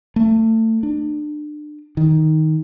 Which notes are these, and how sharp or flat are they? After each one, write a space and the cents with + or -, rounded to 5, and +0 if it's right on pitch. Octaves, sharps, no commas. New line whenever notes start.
A3 +25
D4 +30
D#3 +10